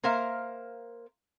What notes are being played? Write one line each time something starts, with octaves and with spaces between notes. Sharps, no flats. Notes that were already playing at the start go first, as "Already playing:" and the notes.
A#3 A#4 C5 E5 F5